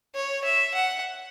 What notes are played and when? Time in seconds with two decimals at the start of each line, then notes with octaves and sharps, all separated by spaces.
0.15 C#5
0.45 E5
0.75 F#5